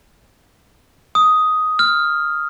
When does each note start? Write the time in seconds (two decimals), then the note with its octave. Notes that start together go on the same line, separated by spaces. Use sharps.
1.15 D#6
1.79 F6